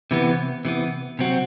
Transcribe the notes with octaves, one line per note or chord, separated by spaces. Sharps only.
C3 E3 B3
C3 E3 B3
C3 F#3 C4 F#4